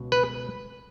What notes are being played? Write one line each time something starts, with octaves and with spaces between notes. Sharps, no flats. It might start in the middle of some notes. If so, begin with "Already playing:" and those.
Already playing: C#2 B2
B4